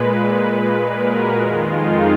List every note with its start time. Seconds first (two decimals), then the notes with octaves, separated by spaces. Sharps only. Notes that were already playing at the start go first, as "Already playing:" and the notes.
Already playing: A#2 G#3 B4
0.79 A#4
1.09 F#4
1.36 F2 D#3 G#3 F4
1.65 D#4